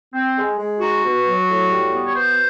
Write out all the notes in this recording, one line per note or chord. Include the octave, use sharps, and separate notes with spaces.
C4
G#3
G#3
D#4 F#4
B2
F#3
A2
G3
B3
C#5
B2 C5